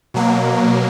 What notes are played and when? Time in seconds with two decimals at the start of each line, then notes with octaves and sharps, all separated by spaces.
0.14 B2 F#3 A#3